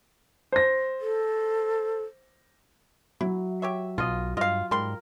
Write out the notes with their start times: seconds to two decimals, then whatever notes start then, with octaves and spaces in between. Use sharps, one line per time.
0.52 C5 A#6
1.01 A4
3.21 F#3 E4
3.62 G4 C#5 E5
3.98 B1 B2 F4 D#5
4.37 G2 F4 D#5 F5
4.71 G#2 G3 A#4 C6